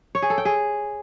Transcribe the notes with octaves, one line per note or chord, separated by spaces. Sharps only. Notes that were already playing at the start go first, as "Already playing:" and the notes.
C#5
G#4
A4
G5
G#4